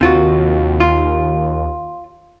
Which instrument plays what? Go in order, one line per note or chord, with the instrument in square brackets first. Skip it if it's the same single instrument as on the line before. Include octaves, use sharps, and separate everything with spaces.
[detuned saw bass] D#2 [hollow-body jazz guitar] C3 F4 F#4
[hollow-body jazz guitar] F4